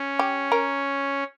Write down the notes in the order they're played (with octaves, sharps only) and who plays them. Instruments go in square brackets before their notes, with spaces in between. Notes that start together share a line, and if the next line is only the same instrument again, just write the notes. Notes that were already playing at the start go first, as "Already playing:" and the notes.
Already playing: [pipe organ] C#4
[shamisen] G4
A#4